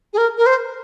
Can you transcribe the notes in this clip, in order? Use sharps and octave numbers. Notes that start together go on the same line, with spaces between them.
G#4
A#4
A#4
C5